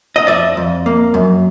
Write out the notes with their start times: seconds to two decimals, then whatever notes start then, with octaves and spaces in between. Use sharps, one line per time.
0.16 D#5
0.27 F2 D5 E5
0.57 F2
0.86 A#3
1.14 F#2